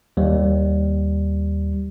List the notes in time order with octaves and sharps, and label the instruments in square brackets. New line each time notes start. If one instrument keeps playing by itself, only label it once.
[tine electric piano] D#2 G3